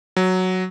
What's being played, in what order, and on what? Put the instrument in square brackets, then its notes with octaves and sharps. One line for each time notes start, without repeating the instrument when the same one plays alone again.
[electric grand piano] F#3